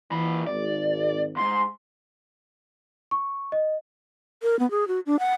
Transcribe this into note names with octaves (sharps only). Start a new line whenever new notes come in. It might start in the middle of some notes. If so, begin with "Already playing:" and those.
A#2 E3 B5
G#1 D5
E2 G#2 C6
C#6
D#5
A#4
B3
G#4
F#4
D4
F#5